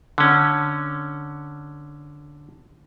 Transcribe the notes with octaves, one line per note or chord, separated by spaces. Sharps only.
D3 C#4